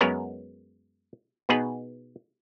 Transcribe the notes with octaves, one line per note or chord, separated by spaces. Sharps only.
F#2 G#3 B3 A#4 C#5
B2 B3 D#4 G#4 B4